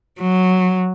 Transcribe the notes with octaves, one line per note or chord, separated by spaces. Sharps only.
F#3